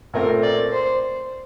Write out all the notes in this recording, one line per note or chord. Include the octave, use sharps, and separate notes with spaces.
A#2 A3 C4 A#4
D5
C5